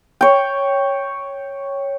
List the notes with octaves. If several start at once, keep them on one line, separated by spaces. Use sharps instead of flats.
C#5 G5